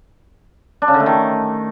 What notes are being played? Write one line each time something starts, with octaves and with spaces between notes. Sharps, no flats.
D4
C#3
D3
A3
D#3